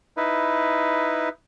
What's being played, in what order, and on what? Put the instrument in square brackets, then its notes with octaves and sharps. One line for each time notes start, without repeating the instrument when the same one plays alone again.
[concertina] D#4 E4 B4